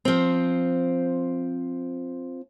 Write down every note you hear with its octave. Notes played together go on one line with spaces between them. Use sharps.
F3 C4